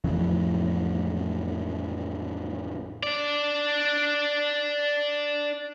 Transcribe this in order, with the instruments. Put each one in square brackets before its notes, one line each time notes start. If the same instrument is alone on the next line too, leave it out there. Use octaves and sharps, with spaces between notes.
[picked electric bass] A1 F2 C#3 E3
[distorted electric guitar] D4 D5